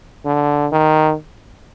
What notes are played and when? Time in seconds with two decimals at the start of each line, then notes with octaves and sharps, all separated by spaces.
0.25 D3
0.72 D#3